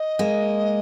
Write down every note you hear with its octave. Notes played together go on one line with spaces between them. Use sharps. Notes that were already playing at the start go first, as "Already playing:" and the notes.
Already playing: D#5
G#3 A#3